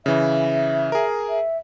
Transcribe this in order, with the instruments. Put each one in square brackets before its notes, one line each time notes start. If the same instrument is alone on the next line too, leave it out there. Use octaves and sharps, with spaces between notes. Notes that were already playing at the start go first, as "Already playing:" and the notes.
[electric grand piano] C#3 E3 [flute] E5
[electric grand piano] G#4 A#4
[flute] E5